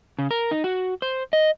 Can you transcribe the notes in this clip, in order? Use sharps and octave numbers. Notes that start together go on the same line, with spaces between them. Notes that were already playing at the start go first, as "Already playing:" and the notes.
C#3
A#4
D#4
F#4
C5
D#5